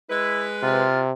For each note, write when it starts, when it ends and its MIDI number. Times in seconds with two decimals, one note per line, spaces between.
0.10 0.84 56
0.10 0.43 64
0.10 0.84 71
0.63 1.12 48
0.63 0.99 65